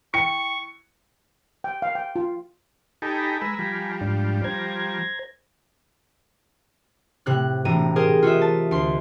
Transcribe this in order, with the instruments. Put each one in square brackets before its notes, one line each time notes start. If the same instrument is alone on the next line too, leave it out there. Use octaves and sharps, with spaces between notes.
[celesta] E4 G5 [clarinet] C#6 [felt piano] C#7
[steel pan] G5
F5
G5
F4
[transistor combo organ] D#4 G4 A4 [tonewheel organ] G#5 A#5 B5
[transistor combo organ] G#3 B4 E6
F3 G3
[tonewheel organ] G#2 D4
C5 A#5 G#6
[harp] A2 C3 F#6
E1 A2 A#5 D#7
G4 G#4 A#4 C5
F4 F#4 D#5 E5
A5
D2 C6